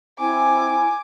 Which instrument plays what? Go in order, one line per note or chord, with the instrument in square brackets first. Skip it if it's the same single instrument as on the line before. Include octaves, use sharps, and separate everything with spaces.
[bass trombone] C4 [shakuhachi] E4 [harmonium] G#5 [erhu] D6